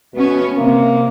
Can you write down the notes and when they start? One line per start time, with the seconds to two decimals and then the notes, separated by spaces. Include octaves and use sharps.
0.14 B2 A3 B3 C#4
0.57 C3 A#3